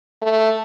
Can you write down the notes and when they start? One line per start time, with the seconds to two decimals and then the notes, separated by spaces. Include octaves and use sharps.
0.22 A3